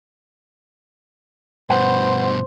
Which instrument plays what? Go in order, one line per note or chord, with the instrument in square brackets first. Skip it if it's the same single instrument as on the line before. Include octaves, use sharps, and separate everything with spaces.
[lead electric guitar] G2 B2 [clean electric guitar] B4 F#5 [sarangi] C5